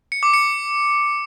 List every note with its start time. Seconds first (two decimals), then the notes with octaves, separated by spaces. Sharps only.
0.12 C#7
0.23 D6
0.33 C#7